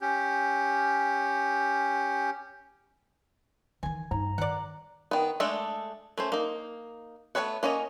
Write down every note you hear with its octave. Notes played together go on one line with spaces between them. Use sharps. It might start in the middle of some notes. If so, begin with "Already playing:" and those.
C#4 G4
D#3 E3 G#5
G2 D#4 A#5
D#3 D5 F#5
D#3 B3
G#3 A3 D4 A4 D5
A3 C#4 C5
A#3 D#4
A3 B3 A4 C#5 F#5
A#3 C#4 C#5 D#5